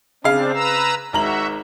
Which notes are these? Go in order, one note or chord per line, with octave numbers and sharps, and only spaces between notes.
C#3 C4 D4 F5
B4 A#5 E6
G#1 F#4 E5 A#5 F#7